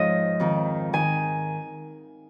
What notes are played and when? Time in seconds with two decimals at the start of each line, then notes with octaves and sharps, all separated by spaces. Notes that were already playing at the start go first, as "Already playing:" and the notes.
Already playing: G#2 F3 C#5 D#5
0.40 F2 D#3
0.93 D#3 G#5